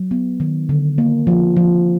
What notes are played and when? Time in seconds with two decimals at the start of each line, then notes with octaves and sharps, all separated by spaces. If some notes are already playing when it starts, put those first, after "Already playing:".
Already playing: F#3
0.11 B3
0.40 D#3
0.69 D3
0.98 A#3
1.27 F3
1.57 F3